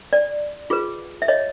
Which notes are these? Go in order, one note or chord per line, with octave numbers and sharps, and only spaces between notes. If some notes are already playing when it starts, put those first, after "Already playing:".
D5
F4 G#4 B4
E5
C#5 D#5